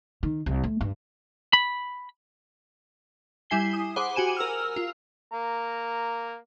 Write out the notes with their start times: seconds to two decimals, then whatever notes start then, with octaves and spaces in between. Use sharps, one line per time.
0.23 D#3
0.46 C2
0.64 A3
0.81 G2
1.53 B5
3.50 G3 E4 G#5 C7 G7
3.73 D#6
3.96 G#4 C5 F#5 B5 D6
4.16 F#4 G4 G#5 D#7 E7
4.37 A#4 E6 F6
4.76 F4
5.32 A#3 A#5